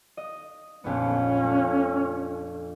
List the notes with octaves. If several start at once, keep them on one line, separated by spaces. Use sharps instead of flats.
D#5
A#1 F2 B3 C#4
A3 D4